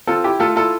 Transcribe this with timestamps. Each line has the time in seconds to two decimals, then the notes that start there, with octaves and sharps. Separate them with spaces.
0.07 C4 F4 A4
0.24 E4 G4
0.39 A3 F4 A4
0.56 E4 F4 A4